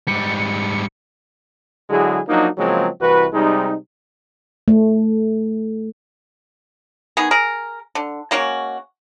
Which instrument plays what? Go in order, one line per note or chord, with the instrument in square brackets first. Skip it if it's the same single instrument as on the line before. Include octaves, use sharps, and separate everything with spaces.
[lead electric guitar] G#2 G3 [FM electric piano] C#7
[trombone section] D3 F#3 G#3 E4 G#4
F3 F#3 A#3 D4 D#4
C#3 F3 F#3 G#3 A#3 C4
C2 E3 F#4 B4
C3 G3 G#3 D#4
[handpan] A3
[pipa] D#3 B3 G#4
G#4 A#4
D3
G#3 A#3 C#4 F#4